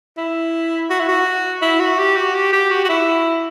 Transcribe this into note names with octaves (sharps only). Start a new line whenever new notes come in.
E4
F#4
E4
F#4
E4
F#4
G4
F#4
G4
G4
F#4
F#4
E4